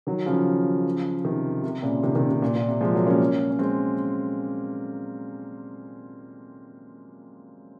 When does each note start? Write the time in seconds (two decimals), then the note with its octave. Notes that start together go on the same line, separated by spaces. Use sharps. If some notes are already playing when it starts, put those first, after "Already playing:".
0.07 D#3 F#3
0.26 C#3 F3
1.25 C3 D#3
1.63 C3
1.83 A#2 C#3
2.03 C3 D#3
2.15 C3 D#3
2.29 C3
2.42 A#2
2.55 A#2
2.68 C3
2.81 F3 G#3
2.94 F#3 A#3
3.07 A#3 C#4
3.51 C#4
3.59 G#3 C4